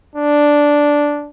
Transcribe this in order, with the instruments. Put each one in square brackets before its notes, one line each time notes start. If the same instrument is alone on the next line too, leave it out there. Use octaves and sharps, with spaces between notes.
[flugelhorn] D4